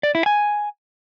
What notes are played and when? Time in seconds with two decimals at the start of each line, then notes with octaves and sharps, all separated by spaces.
0.03 D5
0.15 E4
0.26 G#5